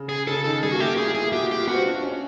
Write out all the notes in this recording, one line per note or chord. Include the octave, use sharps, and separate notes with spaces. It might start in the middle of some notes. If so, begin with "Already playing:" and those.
Already playing: C#3
G#4
C#3 A4
D#3 A4
G3 G#4
A#3 F#4
A3 G4
A#3 G#4
E4
F4 G#4
F#4 G4
F4
G4
F4
C4 F#4
D4
C#4